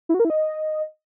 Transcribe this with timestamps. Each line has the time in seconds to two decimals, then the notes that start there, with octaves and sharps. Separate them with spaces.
0.09 E4
0.14 F#4
0.20 A#4
0.25 E4
0.30 D#5